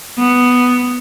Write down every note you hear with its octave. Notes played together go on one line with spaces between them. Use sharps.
B3